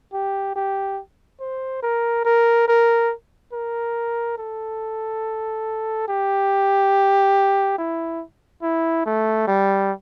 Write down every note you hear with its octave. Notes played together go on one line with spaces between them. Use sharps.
G4
G4
C5
A#4
A#4
A#4
A#4
A4
G4
E4
E4
A3
G3